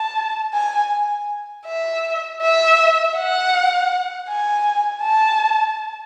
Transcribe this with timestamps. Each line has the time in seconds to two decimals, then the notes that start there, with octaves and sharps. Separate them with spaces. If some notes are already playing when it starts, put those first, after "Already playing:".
Already playing: A5
0.54 G#5
1.66 E5
2.42 E5
3.16 F#5
4.29 G#5
5.02 A5